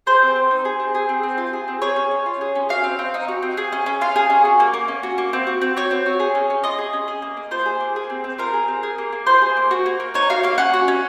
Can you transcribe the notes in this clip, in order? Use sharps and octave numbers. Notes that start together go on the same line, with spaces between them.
G#4 C5
C4
C4
D#4
G#4
C4
G#4
C4
C4
F4
G#4
C4
G#4 C#5
C#4
C#4
F4
G#4
C#4
F#4 F5
C4
C4
D#4
F#4
C4
G#4
C#4
C#4
F4 F5
G#4
C#4
F#4
A#3
A#3
C#4
F#4
A#3
C4
F#4
C4
F#4 C#5
C4
F#4
G#4
C#4
C#4
F4 D#5
G#4
C#4
G#4
A#3
A#3
F4 C5
G#4
A#3
G#4
C4
C4
F4 A#4
G#4
C4
G#4
A#3
A#3
F4 C5
G#4
A#3
F#4
A#3
A#3
D#4 C#5
F#4 F5
A#3 F5
C#4 F#5
F#4
C#4